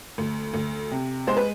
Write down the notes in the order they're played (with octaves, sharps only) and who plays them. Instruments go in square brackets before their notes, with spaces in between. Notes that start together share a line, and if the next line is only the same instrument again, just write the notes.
[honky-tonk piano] D2
D2
C3
G#3 C5
B4